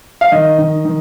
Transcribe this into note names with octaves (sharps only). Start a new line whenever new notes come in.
F5
D#3 D#5
D#3
D#3